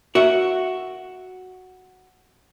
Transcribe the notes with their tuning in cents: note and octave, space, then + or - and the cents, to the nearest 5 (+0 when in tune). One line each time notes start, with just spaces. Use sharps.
F#4 +0 A#4 +0 E5 +0